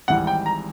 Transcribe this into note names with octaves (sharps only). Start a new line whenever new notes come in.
G#1 G#2 E3 G3 F#5
G5
A#5